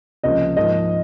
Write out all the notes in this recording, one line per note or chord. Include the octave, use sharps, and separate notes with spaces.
C#2 C3 F3 A#3 D#5
G#2 F3 A#3 D#5